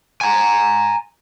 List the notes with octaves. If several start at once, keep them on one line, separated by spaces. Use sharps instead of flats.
G#5 A#5